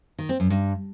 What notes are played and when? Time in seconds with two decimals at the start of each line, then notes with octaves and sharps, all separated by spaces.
0.19 D#3
0.29 C4
0.40 F#2
0.50 G2